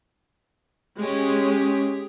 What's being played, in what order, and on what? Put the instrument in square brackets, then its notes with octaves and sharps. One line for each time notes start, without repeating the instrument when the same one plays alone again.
[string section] G#3 C#4 [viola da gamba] G4 G#4